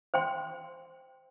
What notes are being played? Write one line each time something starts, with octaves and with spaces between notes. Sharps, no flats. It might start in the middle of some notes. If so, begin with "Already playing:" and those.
C5 G5 C6